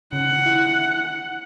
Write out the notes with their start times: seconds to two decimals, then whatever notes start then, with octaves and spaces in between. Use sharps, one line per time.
0.13 C#3 F#5
0.46 E4